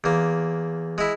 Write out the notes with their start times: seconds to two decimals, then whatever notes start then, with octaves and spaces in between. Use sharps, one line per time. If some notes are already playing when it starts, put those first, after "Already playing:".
0.04 E2 A#3
0.98 G#3 E4